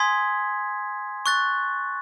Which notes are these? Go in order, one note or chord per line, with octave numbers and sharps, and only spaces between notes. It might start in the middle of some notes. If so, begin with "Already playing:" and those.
Already playing: G#5 C6 D#6 G#6 B6
C#6 F#6 A6